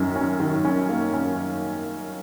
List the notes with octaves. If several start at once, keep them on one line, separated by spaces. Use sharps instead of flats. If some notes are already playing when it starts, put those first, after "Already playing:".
Already playing: F#2 D#3 C#4
C#4
D#3
C#4
A#3
C#4